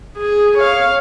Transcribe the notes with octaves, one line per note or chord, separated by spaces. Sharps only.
G#4
C#5 F5